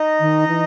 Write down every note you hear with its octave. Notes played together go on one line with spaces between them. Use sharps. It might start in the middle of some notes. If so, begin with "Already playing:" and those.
Already playing: D#4 D#5
D#3
E3